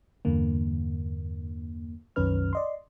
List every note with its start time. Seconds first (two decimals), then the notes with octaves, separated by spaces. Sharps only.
0.25 E2 G2 D3 A#3
2.16 C2 F#2 D#3 C#4 B4 F6
2.53 D5 D#5 C6